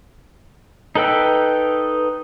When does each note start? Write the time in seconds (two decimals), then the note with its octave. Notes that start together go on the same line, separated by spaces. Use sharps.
0.95 D#4 A4 B4 G5 E6